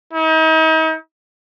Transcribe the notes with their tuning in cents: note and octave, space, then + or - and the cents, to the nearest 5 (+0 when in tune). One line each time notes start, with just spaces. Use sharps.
D#4 +40